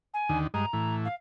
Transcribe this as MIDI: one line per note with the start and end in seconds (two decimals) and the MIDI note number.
0.14 0.38 80
0.29 0.47 39
0.29 0.47 50
0.29 0.47 51
0.54 0.66 43
0.54 0.66 56
0.54 0.66 75
0.54 0.95 82
0.73 1.08 45
0.73 1.08 52
1.05 1.14 77